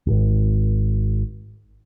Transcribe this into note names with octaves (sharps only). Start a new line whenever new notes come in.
D1 G#1